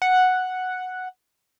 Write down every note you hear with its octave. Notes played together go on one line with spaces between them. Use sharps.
F#5